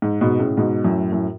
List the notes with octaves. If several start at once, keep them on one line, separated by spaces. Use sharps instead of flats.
G#2
G#2 B2
A2 C#3
G#2 B2
F#2 A2
F#2 A2